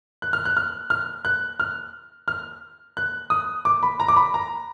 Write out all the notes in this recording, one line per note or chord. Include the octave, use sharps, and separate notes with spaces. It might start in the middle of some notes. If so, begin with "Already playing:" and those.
F#6
F6
F#6
F6
F6
F#6
F6
F6
F#6
D#6
D6
B5
A#5
D6
B5
A#5